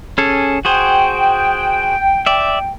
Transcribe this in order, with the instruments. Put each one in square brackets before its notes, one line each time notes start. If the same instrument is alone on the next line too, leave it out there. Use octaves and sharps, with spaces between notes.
[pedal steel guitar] C#4 G#4 A4
[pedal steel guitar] F#4 G#4 C5 [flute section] G5
[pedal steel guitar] D5 E5